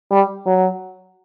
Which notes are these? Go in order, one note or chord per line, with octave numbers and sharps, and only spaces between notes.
G3
F#3